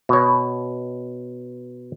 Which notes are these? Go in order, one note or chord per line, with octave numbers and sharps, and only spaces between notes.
B2 C#5